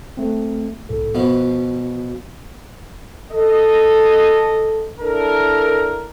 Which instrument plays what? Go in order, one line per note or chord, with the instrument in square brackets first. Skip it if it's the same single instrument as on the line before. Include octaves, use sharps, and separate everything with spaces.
[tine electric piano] A3 C4
C2 A2 A4
[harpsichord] B2 F3 B3 [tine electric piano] F#4
[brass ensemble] A4 D#5
D4 E4 A4 A#4